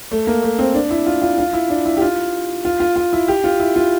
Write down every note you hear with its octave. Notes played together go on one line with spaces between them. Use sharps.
A3
A#3
A3
C4
D4
E4
F4
F4
F4
E4
D4
E4
G4
F4
F4
F4
F4
E4
G4
F4
E4
F4